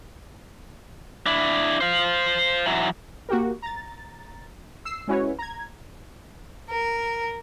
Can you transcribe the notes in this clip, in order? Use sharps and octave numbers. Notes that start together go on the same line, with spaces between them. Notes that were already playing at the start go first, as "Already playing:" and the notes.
D4 E4
C5 F5
E3 F#3
A#3 F#4 G4 A#4
A#5 A6
E6 C7
G#3 C#4 E4 F#4 B4 C#5
A#5 G#6
A#4